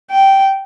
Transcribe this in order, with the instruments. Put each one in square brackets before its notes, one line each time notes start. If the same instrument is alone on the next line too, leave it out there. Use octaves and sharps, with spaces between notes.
[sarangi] G5